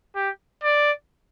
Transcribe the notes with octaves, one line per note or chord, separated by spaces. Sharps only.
G4
D5